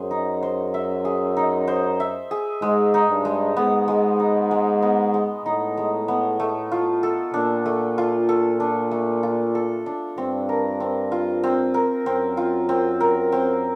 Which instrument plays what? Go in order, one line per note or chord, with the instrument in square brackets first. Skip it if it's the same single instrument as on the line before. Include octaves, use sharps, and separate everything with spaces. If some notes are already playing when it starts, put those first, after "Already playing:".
Already playing: [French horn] F#2 [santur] G#4 C5
[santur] D#4
C5
E5
G#4
D#4
C5
E5
G#4
[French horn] G#2 [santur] G#3
[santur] D#4
[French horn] G2
[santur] G#3
[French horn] G#2 [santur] B3
[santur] G#3
D#4
G#3
B3
G#3
[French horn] A2 [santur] D#4
[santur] G#3
B3
A3
F4
A4
[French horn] A#2 [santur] D4
[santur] A3
F4
A4
D4
A3
F4
A4
D4
[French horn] G2 [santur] C4
[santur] A#4
C4
F4
C4
A#4
[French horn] F#2 [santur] C4
[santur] F4
C4
A#4
C4